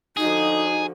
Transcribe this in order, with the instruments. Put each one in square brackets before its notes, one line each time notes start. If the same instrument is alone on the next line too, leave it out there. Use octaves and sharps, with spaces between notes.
[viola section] D3 F3 F#4 [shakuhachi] D#4 [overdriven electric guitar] G#4